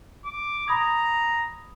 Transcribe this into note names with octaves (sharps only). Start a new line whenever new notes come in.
D6
A#5 B5 D#6 G#6